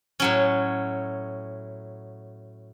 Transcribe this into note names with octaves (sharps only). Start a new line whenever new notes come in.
A2 F#3 C#4